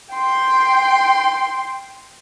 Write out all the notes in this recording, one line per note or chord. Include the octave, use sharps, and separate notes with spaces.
G5 C6